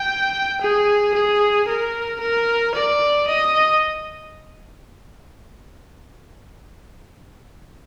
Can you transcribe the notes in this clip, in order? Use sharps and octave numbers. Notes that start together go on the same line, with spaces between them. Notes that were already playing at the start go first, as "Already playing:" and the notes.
Already playing: G5
G#4
G#4
A#4
A#4
D5
D#5